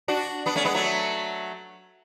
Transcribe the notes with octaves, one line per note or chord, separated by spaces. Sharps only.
D4 F#4
B3 D4
A3 C#4
G#3 B3
F#3 A3